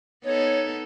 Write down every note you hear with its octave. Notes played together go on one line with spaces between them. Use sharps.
B3 D#4 A4 C#5